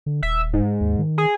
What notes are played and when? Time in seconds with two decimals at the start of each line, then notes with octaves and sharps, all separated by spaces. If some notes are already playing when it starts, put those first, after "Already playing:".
0.06 D3
0.23 D#1 E5
0.53 G#2
0.81 D#2
0.98 D#3
1.18 G#4